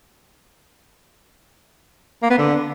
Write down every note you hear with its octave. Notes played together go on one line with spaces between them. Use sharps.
A#3
B3
D3